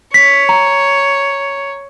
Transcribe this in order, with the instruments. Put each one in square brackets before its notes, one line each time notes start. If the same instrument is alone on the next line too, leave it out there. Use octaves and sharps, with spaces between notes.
[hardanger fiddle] C#5 [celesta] B6
[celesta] A#5